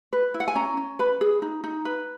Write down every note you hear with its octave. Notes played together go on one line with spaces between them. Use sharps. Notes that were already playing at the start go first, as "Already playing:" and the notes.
B4
E4
F#5
G#5
C#4 A#5
C#4
B4 B5
G#4
D#4
D#4
B4